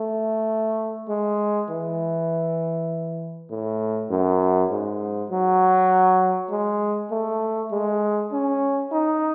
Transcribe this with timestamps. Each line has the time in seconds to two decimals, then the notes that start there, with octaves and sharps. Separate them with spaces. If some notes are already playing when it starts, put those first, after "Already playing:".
Already playing: A3
1.08 G#3
1.69 E3
3.50 A2
4.10 F#2
4.70 G#2
5.30 F#3
6.50 G#3
7.11 A3
7.72 G#3
8.32 C#4
8.92 D#4